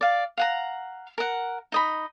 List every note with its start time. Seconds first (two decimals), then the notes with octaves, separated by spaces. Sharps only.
0.01 D5 F5
0.38 F5 F#5 A#5
1.18 A#4 F#5
1.72 D#4 D#5 B5